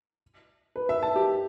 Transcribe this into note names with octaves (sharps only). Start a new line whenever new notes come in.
B4
E5
A5
G4